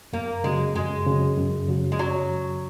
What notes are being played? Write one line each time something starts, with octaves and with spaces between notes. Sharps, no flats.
F#2 A#3
C#3 F#3 G#3
F#2 G#3
C#3 F#3
F#2
C#3 F#3
G#3
F#3